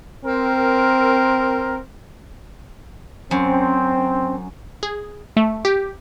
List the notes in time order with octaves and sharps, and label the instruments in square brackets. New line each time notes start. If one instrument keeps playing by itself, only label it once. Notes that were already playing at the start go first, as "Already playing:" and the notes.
[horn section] C4 A#4
[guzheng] F#2 [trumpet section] C4
[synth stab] G#4
A3
G4